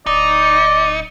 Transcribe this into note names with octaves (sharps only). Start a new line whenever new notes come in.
D1 D#4 D5